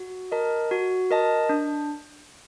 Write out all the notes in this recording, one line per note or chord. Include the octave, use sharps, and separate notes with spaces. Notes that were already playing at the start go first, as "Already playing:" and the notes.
Already playing: F#4
A#4 D#5 A5
F#4
A#4 D#5 A5
D4